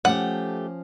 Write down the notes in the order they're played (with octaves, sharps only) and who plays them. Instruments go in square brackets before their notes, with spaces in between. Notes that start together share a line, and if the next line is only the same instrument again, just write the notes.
[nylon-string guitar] F3 C#4 [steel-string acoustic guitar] A3 G4 [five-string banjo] F#5